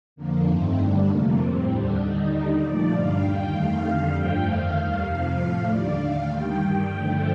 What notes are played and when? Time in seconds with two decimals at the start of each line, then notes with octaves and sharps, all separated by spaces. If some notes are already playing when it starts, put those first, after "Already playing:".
0.16 F2 D3 F3 A#3
0.47 G2 D#3 A3 C4
0.77 G2 D3 G3 D4
1.08 F2 C3 F3 A3 A#3
1.38 A2 G3 C4
1.68 D#2 D3 G3 D4
1.99 D#2 D3 G3 D#4
2.29 D#2 D3 G3
2.60 A#2 F3 A3 D5
2.90 G2 D3 G3 F5
3.21 D#2 D#3 G3 G5
3.51 F2 D#3 A3 F5
3.81 F2 D3 G3 F5
4.12 G2 D3 F3 A3 G5
4.42 F2 D#3 A3 F5
4.73 D#2 D#3 G3 F5
5.04 F2 C3 F3
5.35 A2 F3 A3 F5
5.65 D#2 D3 G3 D5
5.95 D#2 D3 A3 F5
6.25 D#2 D#3 G3 G5
6.56 G2 D#3 G3
6.86 G2 D3 F3 A3